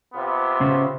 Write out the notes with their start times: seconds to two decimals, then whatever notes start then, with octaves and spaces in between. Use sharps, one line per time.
0.13 C3 B3 F4
0.61 C#3 C#4 C5